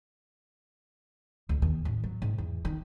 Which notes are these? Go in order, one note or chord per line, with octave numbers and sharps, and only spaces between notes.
D2
D#2
A1
F#3
G#2
E2
D#3